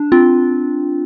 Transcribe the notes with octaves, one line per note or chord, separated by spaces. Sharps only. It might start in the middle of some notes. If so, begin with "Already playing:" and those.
Already playing: D4
C4 F4